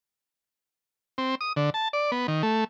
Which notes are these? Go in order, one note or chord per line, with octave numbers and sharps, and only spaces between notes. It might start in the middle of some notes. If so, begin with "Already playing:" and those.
C4
D#6
D3
A5
D5
B3
D#3
A3